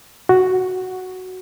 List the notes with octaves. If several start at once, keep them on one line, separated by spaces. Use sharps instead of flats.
F#4